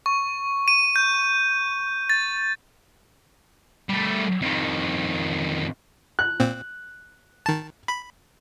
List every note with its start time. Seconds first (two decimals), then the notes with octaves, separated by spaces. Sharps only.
0.06 C#6
0.68 D#7
0.96 G6
2.10 A6
3.89 G3 A3
4.42 F2 D#3
6.19 F#6
6.40 A#2 C4
7.46 D#3 A5
7.88 B5